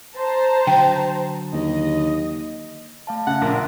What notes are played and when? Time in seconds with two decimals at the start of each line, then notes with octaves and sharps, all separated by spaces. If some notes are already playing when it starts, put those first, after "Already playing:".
0.16 C5 A5 A#5
0.67 D3 F#3 G5
1.53 D#2 D#5
3.07 A3 F5 A5
3.27 C#3 E5 F#5
3.42 A#1 A#4